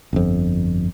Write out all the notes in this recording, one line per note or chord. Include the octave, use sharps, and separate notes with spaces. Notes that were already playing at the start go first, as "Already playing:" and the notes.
G1 F2